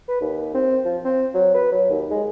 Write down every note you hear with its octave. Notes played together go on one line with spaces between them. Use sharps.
B4
D#2
C4
F3
C4
F#3
B4
F#3
D#2
G#3